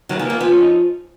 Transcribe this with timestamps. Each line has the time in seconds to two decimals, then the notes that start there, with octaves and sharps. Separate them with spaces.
0.09 D#3 F#3
0.18 C#3 B3
0.25 D#3 A#3
0.40 F3 B3
0.51 C#4
0.62 D#4